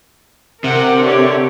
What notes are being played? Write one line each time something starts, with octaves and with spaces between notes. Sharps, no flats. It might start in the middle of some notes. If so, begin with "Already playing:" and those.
C3 A#4 F#5
D3 G4 C#5